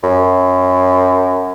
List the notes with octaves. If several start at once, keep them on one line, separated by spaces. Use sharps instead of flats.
F#2